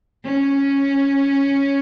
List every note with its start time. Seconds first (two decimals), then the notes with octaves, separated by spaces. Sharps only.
0.25 C#4